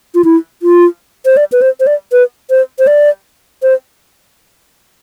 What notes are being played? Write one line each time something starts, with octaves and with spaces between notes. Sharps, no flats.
F4
E4
F4
C5
D5
B4
C5
C5
D5
B4
C5
C5
D5
C5